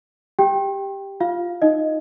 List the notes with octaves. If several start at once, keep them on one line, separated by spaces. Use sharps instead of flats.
G4 G5
F4 F5
D#4 D#5